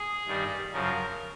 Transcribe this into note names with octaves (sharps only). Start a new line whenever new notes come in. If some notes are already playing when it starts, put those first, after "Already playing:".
Already playing: G#4
G2 D#3 G3
F#2 C#3 F3 A#4